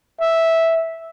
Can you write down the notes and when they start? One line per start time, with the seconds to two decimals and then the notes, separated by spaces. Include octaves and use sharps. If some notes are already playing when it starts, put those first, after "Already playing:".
0.21 E5